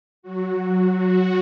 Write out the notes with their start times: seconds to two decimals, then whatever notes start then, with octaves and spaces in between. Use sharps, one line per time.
0.23 F#3 F#4
0.91 F#3 F#4